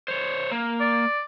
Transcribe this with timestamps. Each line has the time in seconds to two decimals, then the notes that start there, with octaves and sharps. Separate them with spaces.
0.08 C5 C#5
0.52 A#3
0.81 D5